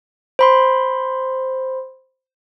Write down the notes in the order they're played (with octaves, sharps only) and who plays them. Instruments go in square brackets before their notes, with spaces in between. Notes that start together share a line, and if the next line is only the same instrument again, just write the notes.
[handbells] C5 B5 C6